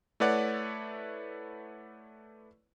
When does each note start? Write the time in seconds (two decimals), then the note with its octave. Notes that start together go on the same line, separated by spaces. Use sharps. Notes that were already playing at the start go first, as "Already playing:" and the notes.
0.20 A3 E4 B4 C#5 D5 F#5